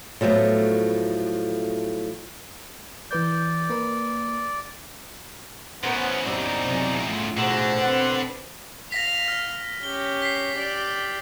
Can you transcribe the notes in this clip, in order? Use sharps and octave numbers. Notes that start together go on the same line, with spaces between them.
A2 F3 F#3 A3 B3
E3 B4 D5 G6
A#3 A#4 B4
E2 C#3 B3 A#4 C5
F#2 C4 D#4 G4 D5 A#5
C3 F#3
A2 F4
B2 D3 F3 F#4 G#4 A#5
C4 B4 F#5 C6
F5 A#6 B6
F6
C#4 G4 G7
B6 C7
G4 D5